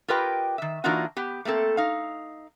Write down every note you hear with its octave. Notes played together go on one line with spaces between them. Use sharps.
F4 G4 A#4 B4 D#5 G5
D#3 E5
E3 A#3 D4 D#4 F4 F#4
B3 G4
A3 A#3 C4 A4
D#4 F5